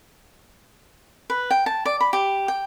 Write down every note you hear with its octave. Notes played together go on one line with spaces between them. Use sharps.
B4
G5
A5
D5
B5
G4
G5